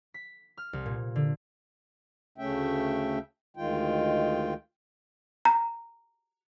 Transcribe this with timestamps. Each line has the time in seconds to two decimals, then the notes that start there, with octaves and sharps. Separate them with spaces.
0.14 B6
0.57 F6
0.73 C2
0.86 A#2
1.16 D3
2.38 D2 C#3 A3 C#4 E5 G5
3.57 D2 D#3 G#3 F4 G5
5.45 A#5